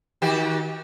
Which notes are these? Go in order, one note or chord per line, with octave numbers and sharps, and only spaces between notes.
D#3 F#4 G4